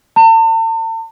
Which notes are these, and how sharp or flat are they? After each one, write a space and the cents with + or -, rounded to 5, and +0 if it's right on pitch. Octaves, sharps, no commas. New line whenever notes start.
A5 +40